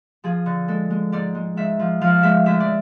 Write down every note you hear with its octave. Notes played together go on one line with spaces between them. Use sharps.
F3 G#4
D3
G#3 A4
G#3
G#2 D5
G#3
G#2 E5
F3
F3 F5
G#3 E5
D2 E5
D5